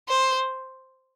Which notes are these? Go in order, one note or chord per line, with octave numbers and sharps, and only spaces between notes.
C5